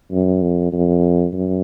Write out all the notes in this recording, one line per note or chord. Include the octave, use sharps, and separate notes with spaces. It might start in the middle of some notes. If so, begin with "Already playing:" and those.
F#2
F2
F2
F#2